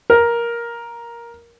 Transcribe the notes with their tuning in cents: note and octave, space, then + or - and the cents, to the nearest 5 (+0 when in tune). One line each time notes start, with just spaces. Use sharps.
A#4 +10